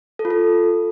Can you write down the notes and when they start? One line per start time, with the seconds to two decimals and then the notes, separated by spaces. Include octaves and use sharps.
0.19 A4
0.25 F4
0.30 A4